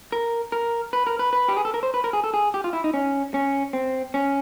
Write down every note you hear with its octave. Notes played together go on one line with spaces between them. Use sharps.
A#4
A#4
B4
A#4
B4
B4
G4
G#4
A4
A#4
C5
B4
A#4
G#4
A4
G#4
G4
F4
E4
D#4
C#4
C#4
C4
C#4